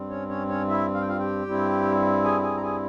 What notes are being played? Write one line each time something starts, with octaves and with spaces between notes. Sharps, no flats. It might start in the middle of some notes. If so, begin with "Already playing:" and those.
Already playing: G2 G3 C4
C#4 C#5
C#4 C#5
C#4 C#5
E4 E5
F5
G5
F4 F5
G4 G5
G2 G3 C4 E4
G#4 G#5
G#4 G#5
A#5
G#4 G#5